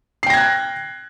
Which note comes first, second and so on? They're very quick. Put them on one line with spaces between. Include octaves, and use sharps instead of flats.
C7 G5 A#6 G#6 F#6